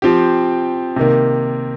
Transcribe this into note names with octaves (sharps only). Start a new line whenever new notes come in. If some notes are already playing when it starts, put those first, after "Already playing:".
F3 C4 G4
C3 D#3 A#3